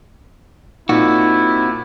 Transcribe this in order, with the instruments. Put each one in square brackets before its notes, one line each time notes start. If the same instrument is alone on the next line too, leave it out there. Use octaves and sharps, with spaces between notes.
[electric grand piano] A#2 [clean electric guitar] C4 F#4 [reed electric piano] D#4 [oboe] E4